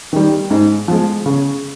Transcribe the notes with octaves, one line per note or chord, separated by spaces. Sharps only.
D#3 G3
G#2
F3 G#3
C#3